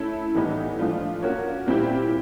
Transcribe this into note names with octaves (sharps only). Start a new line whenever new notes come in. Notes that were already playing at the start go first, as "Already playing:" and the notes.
Already playing: A3 C#4 E4 A4
A2 E3 G3 B3 D#4
F3 A3 D4 F4
A#3 C#4 F#4 A#4 C#5
A#2 G3 C4 E4 G4